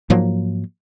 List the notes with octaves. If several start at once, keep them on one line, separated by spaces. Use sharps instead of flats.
G#2 F3 F#3 A#3